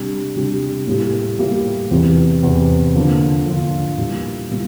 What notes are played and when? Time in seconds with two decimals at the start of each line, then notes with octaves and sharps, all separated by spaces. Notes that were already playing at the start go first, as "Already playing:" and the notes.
Already playing: C3 G3 D4 G4
0.35 C3 G3 D4 G4
0.87 A2 G3 A#3 E4 G4
1.39 A2 G3 A#3 E4 G4
1.91 E2 C3 E3
2.43 E2 C3 E3
2.94 D3 F3 A#3 D4 F4
3.46 D3 F3 A#3 D4 F4
3.98 A#2 G3 A#3 E4
4.50 A#2 G3 A#3 E4